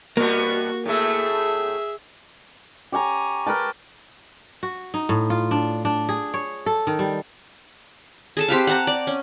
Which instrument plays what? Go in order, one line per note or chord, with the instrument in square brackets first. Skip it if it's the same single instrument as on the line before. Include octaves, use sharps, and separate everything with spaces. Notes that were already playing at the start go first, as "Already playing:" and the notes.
[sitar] B2 G3 B3 [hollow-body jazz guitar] A#3 [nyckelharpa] F#4 C#6
[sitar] A2 A3 [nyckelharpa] G#4 E5
[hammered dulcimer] G4 C#5 G#5 A#5
A#4 B4 G5 A5
[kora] F#4
D#4
A2
F4
D4
D4
G#4
C#5
A4
D#3
G3
[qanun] G#4 A4 A5
C4 G4 B4 F5
F#5 A5 A#5
D5
C#4